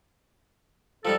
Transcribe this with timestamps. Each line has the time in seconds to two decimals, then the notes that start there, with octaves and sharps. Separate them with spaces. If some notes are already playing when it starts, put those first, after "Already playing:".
1.05 F3 G3 D#4 A4